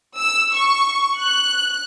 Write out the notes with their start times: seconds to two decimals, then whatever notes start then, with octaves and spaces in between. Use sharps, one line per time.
0.18 E6
0.54 C#6
1.18 F#6